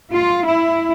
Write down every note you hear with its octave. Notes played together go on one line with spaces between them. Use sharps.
F4
E4